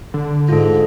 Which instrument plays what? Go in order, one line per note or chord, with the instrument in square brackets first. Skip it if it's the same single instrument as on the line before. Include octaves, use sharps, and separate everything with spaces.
[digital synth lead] D3
[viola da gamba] G#2 [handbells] F4 A4